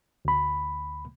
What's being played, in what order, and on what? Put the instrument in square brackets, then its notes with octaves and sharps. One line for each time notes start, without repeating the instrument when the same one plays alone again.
[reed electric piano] D2 B5